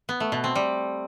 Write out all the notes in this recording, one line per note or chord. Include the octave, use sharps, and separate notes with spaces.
B3
A3
B2
C4
G3